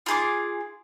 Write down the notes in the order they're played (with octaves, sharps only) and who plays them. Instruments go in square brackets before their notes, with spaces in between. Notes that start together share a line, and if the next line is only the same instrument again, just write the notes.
[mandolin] F4 G#4 D6